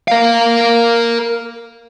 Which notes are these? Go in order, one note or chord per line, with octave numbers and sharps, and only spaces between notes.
A#4 F5